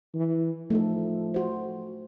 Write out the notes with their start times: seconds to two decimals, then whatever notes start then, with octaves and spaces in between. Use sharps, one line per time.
0.15 E3
0.70 F3 A3 D#4 A4
1.34 F#4 C5